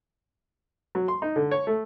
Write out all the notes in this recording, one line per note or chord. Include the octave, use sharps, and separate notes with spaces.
F#3
C6
D#4
D3
C#5
A3